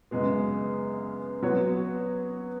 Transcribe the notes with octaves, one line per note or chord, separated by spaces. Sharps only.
F#2 C#3 G#3 B3
F#3 B3 F#4 C#5